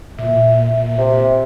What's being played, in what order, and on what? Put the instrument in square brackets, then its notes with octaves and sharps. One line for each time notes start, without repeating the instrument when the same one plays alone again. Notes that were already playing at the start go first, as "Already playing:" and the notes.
[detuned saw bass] A#2 [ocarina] E5
[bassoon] C3